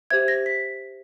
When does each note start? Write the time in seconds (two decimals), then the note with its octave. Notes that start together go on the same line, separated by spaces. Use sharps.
0.11 G4 C5 E5 G#6
0.28 A#6
0.46 B6